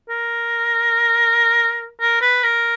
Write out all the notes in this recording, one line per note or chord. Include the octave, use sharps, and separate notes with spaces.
A#4
A#4
B4
A#4